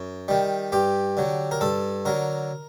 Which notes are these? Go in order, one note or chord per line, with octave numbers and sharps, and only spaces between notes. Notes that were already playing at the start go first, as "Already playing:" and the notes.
Already playing: F#2
D#3 G3
G2 G4
D3 F#3
A#4
G2 A4
D3 F#3 A#4